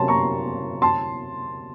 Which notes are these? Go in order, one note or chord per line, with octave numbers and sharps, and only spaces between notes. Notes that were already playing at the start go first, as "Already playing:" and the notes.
Already playing: C3 F#3 A#3 C#4 A5 C6
A#5 C#6
A5 C6